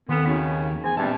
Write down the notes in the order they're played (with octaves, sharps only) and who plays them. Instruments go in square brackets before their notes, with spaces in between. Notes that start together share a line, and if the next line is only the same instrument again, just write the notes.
[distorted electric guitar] D#2 [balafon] D#3 C4 A4 [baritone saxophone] B3
[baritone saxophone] C#3 [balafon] D#4 F#4 C#5
[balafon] E3 B3 [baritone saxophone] G#4
[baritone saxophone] G2 [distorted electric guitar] A#2 A5 [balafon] G#3 C4